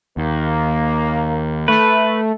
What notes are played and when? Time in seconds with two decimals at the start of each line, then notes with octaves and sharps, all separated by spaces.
0.17 D#2 A#3
1.68 A3 B4